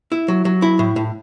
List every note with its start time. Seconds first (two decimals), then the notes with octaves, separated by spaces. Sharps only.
0.12 E4
0.28 F#3
0.45 F#3
0.62 E4
0.79 A2
0.96 A2